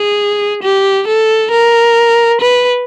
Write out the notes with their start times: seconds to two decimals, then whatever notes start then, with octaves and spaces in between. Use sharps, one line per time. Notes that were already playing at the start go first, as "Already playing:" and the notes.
Already playing: G#4
0.62 G4
1.07 A4
1.52 A#4
2.41 B4